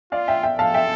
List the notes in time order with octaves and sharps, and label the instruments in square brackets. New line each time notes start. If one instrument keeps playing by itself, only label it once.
[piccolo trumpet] F4 [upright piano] D5 F5
[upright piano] E5 G5
E5 G5
[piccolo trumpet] A4 [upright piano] F5 A5
[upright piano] E5 G5